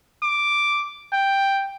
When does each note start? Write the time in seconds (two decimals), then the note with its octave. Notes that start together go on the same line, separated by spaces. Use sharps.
0.22 D6
1.13 G5